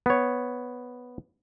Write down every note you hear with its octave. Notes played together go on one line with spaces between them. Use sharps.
B3 C#5